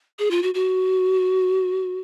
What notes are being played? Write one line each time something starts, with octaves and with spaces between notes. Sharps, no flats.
G#4
F4
F#4
F#4